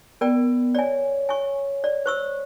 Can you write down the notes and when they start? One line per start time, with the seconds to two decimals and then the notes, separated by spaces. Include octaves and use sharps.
0.21 B3 A#4 D5 G5
0.75 C#5 D5 G#5
1.29 G#5 C#6
1.84 D5
2.06 C5 C#6 E6